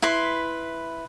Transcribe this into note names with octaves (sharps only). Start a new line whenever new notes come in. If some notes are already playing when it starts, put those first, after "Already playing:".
E4 B4 C6